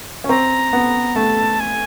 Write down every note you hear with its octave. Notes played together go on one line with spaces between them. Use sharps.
C#4
C4 A#5
B3
A3 A5
G#5